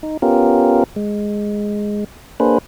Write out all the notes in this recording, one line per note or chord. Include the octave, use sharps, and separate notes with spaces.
D#4
B3 C#4 F4 G4 A#4
G#3
A#3 D4 G#4 B4 C5